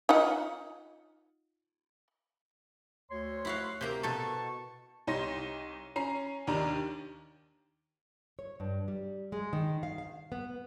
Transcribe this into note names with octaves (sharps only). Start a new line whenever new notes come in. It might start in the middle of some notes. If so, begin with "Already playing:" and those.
D#4 F4 F#5
D2 C#5 C6
E4 F#4 F5
C3 A#3 A#5
B2 A4 A5 C#6
C2 D#4 C#5 C6 A#6
C#4 A#5 C7
D#2 D#3 D4 A#5
C#5
G2
G3
G#3
D#3
F5
F5
B3